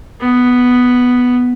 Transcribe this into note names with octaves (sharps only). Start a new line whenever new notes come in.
B3